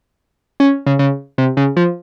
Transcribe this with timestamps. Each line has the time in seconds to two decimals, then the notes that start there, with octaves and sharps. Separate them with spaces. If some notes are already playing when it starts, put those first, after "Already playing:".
0.60 C#4
0.86 C#3
0.99 C#3
1.38 C3
1.57 C#3
1.77 F3